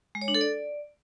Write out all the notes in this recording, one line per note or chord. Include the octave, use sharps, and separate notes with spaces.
G#3
C#5
D4
A4
D5